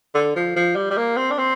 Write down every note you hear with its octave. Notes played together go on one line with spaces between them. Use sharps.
D3
F3
F3
G3
G3
A#3
C4
D4
C4